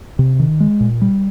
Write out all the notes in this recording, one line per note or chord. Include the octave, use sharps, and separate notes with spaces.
C3
D#3
G#3
A#2
G3